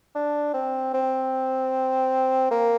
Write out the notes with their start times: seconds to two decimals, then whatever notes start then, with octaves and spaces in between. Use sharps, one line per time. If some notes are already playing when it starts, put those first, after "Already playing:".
0.15 D4
0.54 C4
0.94 C4
2.51 A#3